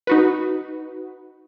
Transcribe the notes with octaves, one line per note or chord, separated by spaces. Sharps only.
D#4 F#4 B4